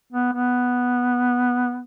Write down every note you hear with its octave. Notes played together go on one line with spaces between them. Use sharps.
B3
B3